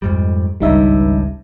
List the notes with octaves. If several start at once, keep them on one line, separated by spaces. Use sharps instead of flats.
F2 G#2 G3
G#1 C#2 G2 G3 D#4 E5